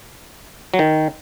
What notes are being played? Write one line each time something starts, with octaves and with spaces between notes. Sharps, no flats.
F#3
D#3